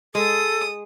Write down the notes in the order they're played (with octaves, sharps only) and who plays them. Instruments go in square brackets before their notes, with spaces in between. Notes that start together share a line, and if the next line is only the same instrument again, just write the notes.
[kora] G#3 [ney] A4 [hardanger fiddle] D#6